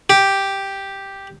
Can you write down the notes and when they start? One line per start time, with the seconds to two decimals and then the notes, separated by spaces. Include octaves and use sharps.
0.10 G4